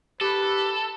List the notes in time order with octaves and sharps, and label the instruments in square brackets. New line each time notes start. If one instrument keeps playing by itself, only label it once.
[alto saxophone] G4 [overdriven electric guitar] A4 [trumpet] B4